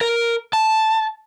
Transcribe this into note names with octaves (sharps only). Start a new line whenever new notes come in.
A#4
A5